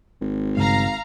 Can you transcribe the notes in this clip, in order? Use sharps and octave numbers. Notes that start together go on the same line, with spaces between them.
G#1
G2 C#3 G#3 F5 A#5